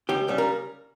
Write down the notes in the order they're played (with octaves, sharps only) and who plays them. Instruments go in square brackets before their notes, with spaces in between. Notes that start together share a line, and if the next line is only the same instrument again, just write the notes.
[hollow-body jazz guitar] C#2 G4
C#3 G3
A#4